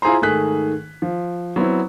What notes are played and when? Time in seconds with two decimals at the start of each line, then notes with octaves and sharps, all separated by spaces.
0.02 E4 F4 G#4 C5 A#5 C6
0.22 G#2 D#3 A3 G#4 F#6 B6
1.02 F3
1.56 F#3 B3 C4 E4